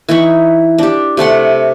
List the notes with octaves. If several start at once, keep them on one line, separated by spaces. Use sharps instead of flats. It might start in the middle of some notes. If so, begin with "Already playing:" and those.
E3 D#4 E4 C#6
D4 G4
C3 A3 F#5 C6